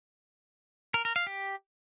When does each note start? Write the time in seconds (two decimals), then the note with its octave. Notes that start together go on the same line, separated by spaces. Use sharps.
0.94 A#4
1.05 A#4
1.16 F5
1.27 G4